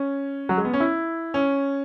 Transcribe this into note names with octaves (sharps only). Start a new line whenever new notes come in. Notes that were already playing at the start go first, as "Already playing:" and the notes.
Already playing: C#4
F#3
G#3
B3
C#4
E4
C#4